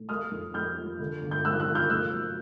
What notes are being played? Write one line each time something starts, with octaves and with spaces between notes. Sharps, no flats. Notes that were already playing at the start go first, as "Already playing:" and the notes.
Already playing: A2
A3 D#6 F6
F2
F2 F6 G6
F3
D3
G1
G6
F3 E6 F#6
E6 F#6
F3
F6 G6
A3 E6 F#6
F#3